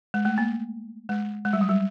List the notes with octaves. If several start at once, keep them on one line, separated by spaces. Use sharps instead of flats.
G#3
A3
A#3
G#3
G#3
G3
F#3
G3